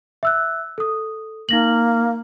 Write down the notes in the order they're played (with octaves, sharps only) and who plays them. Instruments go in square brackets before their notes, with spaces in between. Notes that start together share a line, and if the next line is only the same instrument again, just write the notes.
[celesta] E5 E6 F#6
A4 D#6
[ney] A#3 [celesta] D#4 A#6 F#7